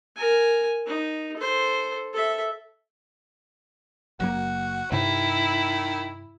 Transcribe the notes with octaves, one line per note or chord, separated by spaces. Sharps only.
A#4 G#5
D#4
A4 C5
A4 E5
F#1 F#3 A#3 F#4
G2 C3 D#3 E4